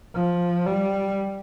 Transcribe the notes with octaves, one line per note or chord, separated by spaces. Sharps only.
F3
G3